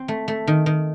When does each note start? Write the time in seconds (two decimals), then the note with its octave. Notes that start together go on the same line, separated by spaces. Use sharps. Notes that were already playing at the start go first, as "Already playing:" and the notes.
Already playing: C4
0.08 A3
0.28 A3
0.47 D#3
0.66 D#3